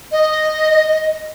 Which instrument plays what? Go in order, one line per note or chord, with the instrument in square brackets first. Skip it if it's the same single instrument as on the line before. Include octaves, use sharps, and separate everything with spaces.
[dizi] D#5